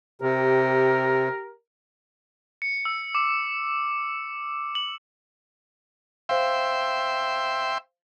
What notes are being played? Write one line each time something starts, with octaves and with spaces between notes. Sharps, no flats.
C3 G4 A#4
C#7
E6
D6
F#7
C5 E5 F5 G5 C6